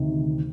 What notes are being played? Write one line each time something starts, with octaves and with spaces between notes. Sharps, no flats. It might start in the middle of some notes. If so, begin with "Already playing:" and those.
Already playing: D2 C3 D#3